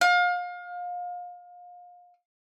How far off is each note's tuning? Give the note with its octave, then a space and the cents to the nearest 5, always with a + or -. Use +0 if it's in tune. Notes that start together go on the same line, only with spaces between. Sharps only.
F5 +30